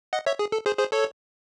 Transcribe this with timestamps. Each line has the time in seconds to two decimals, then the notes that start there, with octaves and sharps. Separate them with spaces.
0.13 D#5 F#5
0.26 C#5 E5
0.39 G#4
0.52 A4
0.66 G#4 C5
0.79 G#4 C5
0.92 A4 C#5